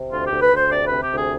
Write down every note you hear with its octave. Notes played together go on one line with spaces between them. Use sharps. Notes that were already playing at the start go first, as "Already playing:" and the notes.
Already playing: C3
D2 F4
G4
D2
B4
D2 C5
C3 D5
C3 B4
G4
D2
G#4